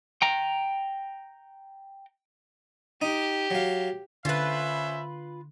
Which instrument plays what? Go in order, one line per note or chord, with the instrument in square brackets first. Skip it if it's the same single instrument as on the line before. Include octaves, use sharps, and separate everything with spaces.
[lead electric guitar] G5 A#5
[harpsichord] D#4 [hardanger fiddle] G4
[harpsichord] F#3 F5
[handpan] D3 [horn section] C#4 C5 E5 [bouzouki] F4 B4